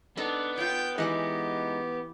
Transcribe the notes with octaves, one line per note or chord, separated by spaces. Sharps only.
B3 D4 D#4 A4 A#5
F4 C#5 G5
E3 G#3 D#4 G4 F#5 G#5